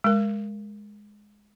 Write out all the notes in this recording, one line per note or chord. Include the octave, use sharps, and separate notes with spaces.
G#3 A#4